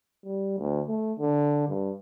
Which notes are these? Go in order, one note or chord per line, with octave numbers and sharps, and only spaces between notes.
G3
D2
A3
D3
G2